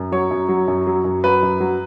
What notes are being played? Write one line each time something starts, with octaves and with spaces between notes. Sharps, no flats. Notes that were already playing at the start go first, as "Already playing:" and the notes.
Already playing: F#2
F#3 C#5
F#2
F#3
F#2
F#3
F#2
F#3 B4
F#2
F#3